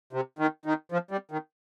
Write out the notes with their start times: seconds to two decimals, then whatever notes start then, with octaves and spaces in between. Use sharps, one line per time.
0.13 C3
0.39 D#3
0.66 D#3
0.92 F3
1.11 G3
1.31 D#3